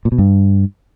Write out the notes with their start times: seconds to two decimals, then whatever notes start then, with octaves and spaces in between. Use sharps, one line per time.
0.05 A#2
0.12 B2
0.18 G2